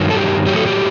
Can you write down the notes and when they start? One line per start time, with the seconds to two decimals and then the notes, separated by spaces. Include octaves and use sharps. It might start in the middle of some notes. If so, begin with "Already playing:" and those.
Already playing: G2 D#3 F#3
0.10 A4
0.15 G4
0.46 A2 F#3 G4
0.56 A4
0.67 G4